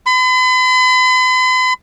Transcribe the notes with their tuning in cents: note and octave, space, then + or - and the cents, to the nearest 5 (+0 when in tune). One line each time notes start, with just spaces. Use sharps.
B5 +45